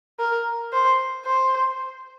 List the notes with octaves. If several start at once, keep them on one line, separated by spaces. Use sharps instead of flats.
A#4
C5
C5